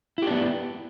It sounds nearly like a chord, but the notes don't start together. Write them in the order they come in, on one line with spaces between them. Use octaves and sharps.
E4 G4 D4 B3